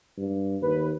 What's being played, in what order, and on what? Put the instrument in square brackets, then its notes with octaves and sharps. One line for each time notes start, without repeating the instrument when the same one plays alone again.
[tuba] G2
[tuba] D#2 [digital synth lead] B4